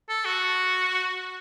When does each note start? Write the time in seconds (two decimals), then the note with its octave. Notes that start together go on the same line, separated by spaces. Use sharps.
0.09 A4
0.25 F#4